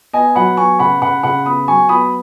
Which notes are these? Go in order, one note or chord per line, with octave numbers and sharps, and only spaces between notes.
B3 D#5 G#5
F#3 F#5 B5
B3 G#5 C#6
C#3 F#5 B5
C#3 F#5 B5
C#3 F#5 B5
B3 B5 D#6
F#3 G#5 C#6
B3 B5 D#6